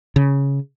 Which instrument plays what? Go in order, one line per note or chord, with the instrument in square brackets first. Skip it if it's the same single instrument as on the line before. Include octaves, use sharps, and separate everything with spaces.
[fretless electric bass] C#3